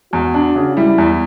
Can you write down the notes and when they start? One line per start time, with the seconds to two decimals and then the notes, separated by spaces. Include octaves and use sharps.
0.12 E2 F#4
0.34 D4
0.55 C#3
0.77 G3 E4
0.98 E2